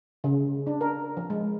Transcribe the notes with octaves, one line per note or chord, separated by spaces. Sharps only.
C#3
D4
A#4
F3
G#3